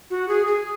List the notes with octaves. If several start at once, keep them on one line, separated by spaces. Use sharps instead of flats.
F#4
G#4
G#4